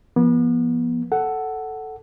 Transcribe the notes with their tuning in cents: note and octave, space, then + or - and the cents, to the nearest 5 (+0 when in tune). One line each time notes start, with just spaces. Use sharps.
F3 -30 B3 -35
A4 +0 F#5 +10